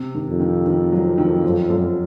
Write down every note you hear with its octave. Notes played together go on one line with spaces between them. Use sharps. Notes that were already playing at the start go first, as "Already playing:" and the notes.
Already playing: C3
D#3
F2
D#3
D#3
F#3
D#3
F#2
F#2